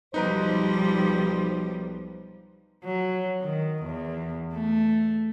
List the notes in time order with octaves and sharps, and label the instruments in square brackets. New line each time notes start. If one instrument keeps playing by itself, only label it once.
[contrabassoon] B1 [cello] F3 G3 [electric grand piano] D#4 B4 A#5 [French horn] C5
[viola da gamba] F#3
D#3
E2
A3